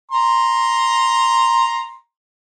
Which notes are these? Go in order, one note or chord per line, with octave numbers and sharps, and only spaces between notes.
A#5 C6